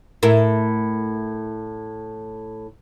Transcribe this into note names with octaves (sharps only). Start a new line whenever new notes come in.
A2 E4 A#4